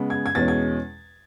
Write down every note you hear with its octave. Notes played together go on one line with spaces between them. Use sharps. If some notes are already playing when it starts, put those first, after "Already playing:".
Already playing: C#3 G#3 B3
G#6
G#6
E2 B2 G#3 C#4 A6
G#6